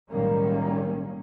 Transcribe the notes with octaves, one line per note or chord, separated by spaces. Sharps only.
B1 A2 D#3 G3 A#3 C#4